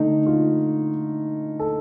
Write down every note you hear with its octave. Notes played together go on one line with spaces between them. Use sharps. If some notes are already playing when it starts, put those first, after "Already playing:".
Already playing: D3 A3 D#4
F4
A4